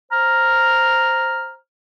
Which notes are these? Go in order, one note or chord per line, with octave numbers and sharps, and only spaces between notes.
C5 A#5 F6